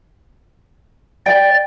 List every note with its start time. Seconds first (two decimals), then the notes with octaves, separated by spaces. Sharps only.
1.26 D5 G5